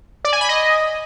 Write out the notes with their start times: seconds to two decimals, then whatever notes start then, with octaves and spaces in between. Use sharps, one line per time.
0.25 D5
0.33 G#5
0.41 B5
0.49 D#5